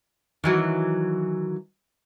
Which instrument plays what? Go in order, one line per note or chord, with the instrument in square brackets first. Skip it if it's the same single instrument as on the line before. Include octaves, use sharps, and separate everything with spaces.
[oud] D#3 E3 F#3